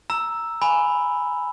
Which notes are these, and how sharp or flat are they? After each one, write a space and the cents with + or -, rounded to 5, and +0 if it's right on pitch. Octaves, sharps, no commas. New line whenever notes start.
A#5 +0 E6 +0
G#5 +0 B5 +0